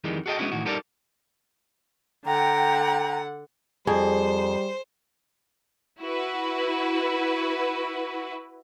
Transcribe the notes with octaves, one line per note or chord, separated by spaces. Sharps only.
F2 D#3 E3 G3 G#3
F#4 G#4 A4 D5 D#5 G5
G#3 B3 C#4 D4 E4 F#4
A2 D#3 E3 F#4
G3 D#4 G4 A4 A#4 D5
D3 F#5 G5 A#5
F2 G3 G#4 C5
E4 F#4 B4